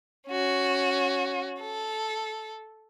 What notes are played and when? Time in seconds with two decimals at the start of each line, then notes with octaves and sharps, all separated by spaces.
0.28 C#4 F#4
1.60 A4